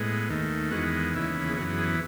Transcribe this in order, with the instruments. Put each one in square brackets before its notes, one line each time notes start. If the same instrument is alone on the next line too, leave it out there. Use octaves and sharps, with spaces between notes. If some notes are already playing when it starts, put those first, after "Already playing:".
Already playing: [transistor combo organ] A2 G#3 B3
D#2 D#3 A3
E2 D#3 G#3 B3 F#4
D#2 C#3 E3 B3 E4
G#4
B3 F#4
F#2 E3
G#4